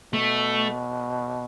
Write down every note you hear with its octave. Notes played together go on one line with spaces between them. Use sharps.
B2 A3